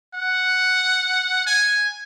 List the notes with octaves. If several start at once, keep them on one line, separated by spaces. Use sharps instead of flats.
F#5
G#5